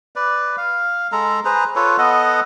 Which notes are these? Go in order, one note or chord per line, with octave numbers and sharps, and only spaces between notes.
B4 D5
F5
G#3 A4 A#5
G#4 B4 C5 A#5
F4 A4 B4 C#5
B3 A4 D#5 F#5